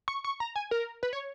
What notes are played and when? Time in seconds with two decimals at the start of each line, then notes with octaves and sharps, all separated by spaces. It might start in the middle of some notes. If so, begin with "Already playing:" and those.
0.08 C#6
0.24 C#6
0.40 A#5
0.56 G#5
0.71 A#4
1.03 B4
1.13 C#5